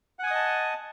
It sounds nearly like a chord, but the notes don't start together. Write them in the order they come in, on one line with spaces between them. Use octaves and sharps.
F#5 G#5 D#6 D#5 A5